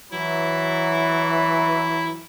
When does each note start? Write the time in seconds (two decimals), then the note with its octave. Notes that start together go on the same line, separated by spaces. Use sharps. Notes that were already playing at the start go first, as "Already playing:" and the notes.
0.11 E3 F#3 E4